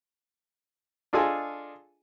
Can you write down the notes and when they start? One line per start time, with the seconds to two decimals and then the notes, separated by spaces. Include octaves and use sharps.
1.13 D4 F4 G#4 A4 D#5 G#5